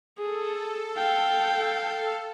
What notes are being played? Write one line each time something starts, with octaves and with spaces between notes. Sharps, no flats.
G#4 A4
F5 G5